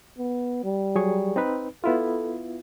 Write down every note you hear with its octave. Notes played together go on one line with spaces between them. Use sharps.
B3
G3
F#3 G#4 C#6
C4 D#4 B4
B3 E4 F4 A4